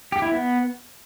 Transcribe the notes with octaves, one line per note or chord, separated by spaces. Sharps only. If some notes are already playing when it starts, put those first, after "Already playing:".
G4
E4
B3